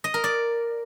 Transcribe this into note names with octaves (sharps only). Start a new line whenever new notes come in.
D#5
A#4
D5